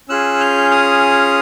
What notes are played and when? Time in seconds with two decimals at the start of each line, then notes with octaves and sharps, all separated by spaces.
0.09 C#4 F4 G#4 E6 F#6
0.40 F6 G6
0.71 D#6 F6